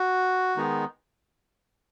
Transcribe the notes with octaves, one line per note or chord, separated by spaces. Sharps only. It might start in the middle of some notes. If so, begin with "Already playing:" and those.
Already playing: F#4
D#3 G#3 B3 D#4